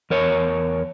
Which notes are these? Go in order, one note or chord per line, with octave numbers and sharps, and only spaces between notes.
E2 A#4 C#5